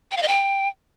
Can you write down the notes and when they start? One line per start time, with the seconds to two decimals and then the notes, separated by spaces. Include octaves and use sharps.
0.11 G5
0.17 F5
0.22 D#5
0.28 G5